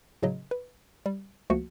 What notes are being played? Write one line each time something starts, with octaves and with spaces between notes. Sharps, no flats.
A2 C#3 F#3 D#5
B4
G3
C#2 F3 A3 A#3 F#4 C#7